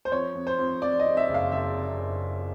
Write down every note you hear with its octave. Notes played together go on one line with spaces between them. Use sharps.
C5
F2 C#5
F2
C5
F2
F2 D5
D#5
C3
E5
F#1
F5
F#1 E5
C3
F#1